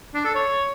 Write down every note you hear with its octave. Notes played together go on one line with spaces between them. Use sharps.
D4
A4
C#5